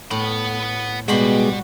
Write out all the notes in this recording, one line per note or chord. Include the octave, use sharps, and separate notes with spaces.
A2 B3 B5
B2 G3 G#3 F#4 B5 C6